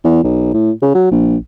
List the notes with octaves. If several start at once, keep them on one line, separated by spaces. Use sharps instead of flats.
E2
B1
A2
C#3
F#3
A#1